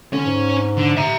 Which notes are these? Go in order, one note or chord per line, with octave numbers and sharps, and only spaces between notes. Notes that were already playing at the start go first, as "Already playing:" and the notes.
D3 C#4 C#5
G#2
D3
E5 A#5